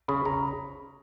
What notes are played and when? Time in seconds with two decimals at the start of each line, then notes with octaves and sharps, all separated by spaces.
0.08 C#3 B5
0.18 C#6
0.25 C#3 A#5
0.34 B5